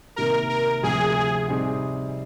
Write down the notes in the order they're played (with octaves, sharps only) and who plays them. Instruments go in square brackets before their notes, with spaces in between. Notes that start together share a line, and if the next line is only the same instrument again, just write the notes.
[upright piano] C3 D#3 A#3 [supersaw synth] A#4
[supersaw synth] A#4
[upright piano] D2 C3 F3 [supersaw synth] G#4
[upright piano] C3 G3 C4 D#4 G#4